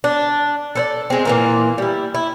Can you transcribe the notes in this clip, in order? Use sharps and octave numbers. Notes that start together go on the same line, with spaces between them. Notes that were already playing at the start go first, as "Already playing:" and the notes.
D4
A4 C5 D5
G#3 C4
A#2 E3 A#3
G3 E4
E4